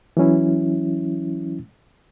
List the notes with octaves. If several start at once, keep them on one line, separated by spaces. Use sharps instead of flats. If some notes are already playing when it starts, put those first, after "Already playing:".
E3 F#3 C#4 E4